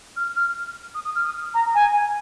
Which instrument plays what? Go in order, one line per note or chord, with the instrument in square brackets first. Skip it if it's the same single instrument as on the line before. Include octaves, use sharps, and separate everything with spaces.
[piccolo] F6
F6
D#6
D#6
F6
D#6
A#5
G#5